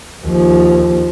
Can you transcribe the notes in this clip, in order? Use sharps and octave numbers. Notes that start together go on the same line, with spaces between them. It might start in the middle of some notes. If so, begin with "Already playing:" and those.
D#2 F3